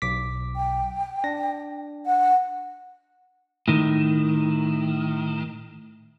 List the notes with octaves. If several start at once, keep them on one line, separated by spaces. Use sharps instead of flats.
B1 D6 B6
G5
D4 A#6
F#5
A2 D#3